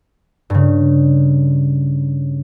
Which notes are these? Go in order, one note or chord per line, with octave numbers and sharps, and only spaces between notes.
G2 C#3